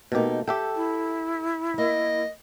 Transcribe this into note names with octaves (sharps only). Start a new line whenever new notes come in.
B2 A3 A#3 D#4 G4
G4 A4 E5 G5
E4
A#3 D#5